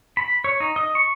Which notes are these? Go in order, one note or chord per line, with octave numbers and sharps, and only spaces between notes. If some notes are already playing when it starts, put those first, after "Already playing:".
B5
C#5
D#4
D#5
C#6